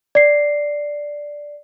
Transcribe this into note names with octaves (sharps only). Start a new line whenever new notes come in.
D5 C7